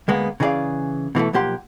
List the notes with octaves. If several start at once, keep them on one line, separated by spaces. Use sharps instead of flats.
D2 G#3 A#3 B3
C#3 E3 D#4 G#4 D5 F5
B2 E3 G#3 A3
B1 F3 A#3 G4 F#5 C6